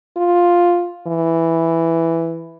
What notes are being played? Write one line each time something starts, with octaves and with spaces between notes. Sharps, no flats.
F4
E3